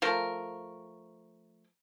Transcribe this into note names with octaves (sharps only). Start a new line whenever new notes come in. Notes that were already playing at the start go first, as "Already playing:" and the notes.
F3 A3 A#4